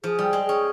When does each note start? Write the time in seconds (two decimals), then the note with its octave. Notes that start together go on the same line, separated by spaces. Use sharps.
0.03 F3 G#4
0.19 G3 G5
0.33 G#3
0.43 G#4
0.49 C#4